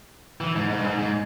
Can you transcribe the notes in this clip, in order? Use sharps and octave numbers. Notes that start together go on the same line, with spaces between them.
E3
G#2
G#2
G2
G#2
G#2